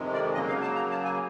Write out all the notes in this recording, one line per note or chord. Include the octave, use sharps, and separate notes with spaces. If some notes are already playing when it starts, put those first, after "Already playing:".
Already playing: F2 C3 D#3 G#3
D5
C#3 F#3 A#3 D#5
F5
A5
A#5
A5
G#5